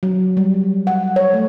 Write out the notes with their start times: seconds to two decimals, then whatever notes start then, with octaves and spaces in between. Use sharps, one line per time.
0.03 F#3
0.37 G3
0.87 F#5
1.16 C#5
1.34 A3